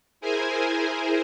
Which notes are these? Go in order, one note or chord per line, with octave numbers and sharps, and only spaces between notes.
E4 G#4 A#4 C5 G#5